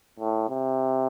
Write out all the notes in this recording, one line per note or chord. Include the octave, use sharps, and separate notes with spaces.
A2
C3